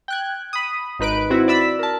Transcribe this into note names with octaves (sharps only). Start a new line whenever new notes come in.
G5 F#6 G#6
B5 D#6
G#1 D#4 B4 F#6 D7
C4 E4 F#4
D5 E5 B5 E6 B6
A#4 A5